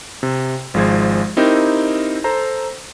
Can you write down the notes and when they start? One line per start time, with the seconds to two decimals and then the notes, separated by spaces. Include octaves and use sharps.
0.23 C3
0.74 G#1 F3 G#3 C5 G#6
1.37 C4 D#4 E4 G4 A#4
2.24 A4 C5 A#5